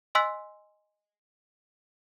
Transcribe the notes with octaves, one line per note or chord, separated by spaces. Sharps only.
D#5 G#5 C6 E6 F#6 B6